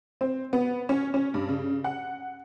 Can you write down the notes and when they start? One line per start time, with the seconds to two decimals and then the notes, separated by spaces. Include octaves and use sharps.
0.21 C4
0.53 B3
0.89 C#4
1.14 C#4
1.34 G2
1.48 C#3
1.84 F#5